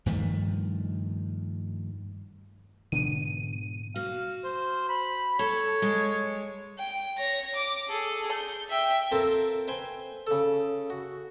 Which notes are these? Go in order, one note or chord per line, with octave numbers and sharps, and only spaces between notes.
G2 D#3 F3 A3
G#2 B2 D3 E3 B3 D#7
F#4 F5
C5
B5
A4 C#5
G#3
G5
C#5 A#6
D6
G#4 A4
G6
E5 G5
C4 F4 A4 A#4 C5 F5
B4 C5 G5 G#5
C#3 A4
F#4